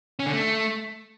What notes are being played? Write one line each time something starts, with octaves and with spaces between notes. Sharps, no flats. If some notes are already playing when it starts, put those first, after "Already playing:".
C#4
D3
A3